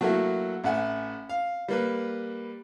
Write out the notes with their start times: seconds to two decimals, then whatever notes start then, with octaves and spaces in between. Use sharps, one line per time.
0.01 F#3 A3 A#3 E4 F#4
0.64 A1 E5 F#5 G#5
1.29 F5
1.68 G3 A#3 B4